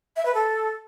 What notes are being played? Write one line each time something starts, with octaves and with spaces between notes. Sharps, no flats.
E5
B4
A4